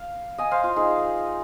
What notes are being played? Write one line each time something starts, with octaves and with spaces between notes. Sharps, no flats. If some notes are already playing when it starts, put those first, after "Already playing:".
Already playing: F5
D#5 G#5
C5 F5
F4
D#4 G#4